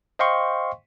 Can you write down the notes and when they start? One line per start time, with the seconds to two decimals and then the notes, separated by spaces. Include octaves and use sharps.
0.19 C5 D#5 F5 G5 C6 C#6